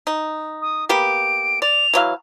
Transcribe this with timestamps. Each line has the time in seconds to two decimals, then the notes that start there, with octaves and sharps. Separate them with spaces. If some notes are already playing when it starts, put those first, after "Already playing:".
0.07 D#4
0.62 D#6
0.89 A#3 B3 G4 D7
1.62 D5 F7
1.94 E3 F#3 F5